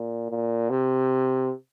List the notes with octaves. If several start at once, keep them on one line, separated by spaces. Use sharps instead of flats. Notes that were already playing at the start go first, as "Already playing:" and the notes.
Already playing: A#2
A#2
C3